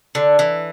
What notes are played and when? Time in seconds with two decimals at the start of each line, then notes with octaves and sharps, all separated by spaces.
0.15 D3
0.39 E3